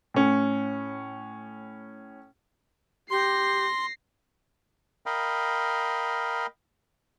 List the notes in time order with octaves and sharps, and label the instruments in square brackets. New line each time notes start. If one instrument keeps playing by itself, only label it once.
[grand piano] A2 C#4
[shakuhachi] G4 [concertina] C6 [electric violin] A#6 C7
[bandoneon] A#4 D#5 F5 G5 B5